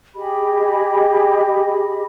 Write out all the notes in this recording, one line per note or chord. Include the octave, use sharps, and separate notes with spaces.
G4 G#4 D#5 B5